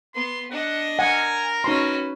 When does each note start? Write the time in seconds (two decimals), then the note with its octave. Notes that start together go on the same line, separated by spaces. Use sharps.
0.14 B3 C6
0.52 D4 D#5 F#5
0.99 A#4 F#5 G#5
1.64 C#4 D#4 F#4 B4 C6